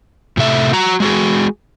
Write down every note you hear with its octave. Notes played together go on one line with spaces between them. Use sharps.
A2 C3 A3 E5
F#4 A#5
G#3 F#4 G#4